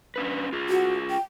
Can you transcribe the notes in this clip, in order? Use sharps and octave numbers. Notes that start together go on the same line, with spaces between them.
C#4 D4 B4
F4 G#4
F#4
G5